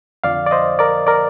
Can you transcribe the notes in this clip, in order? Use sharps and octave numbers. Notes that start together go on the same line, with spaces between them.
F2 D3 F3 D5 F5
D5
C5 D#5
A#4 D5
A#4 D5